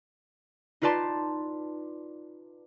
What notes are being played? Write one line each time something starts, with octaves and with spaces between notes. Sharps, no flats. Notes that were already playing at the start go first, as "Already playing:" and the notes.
D#4 F4 B4 D5 A5 C6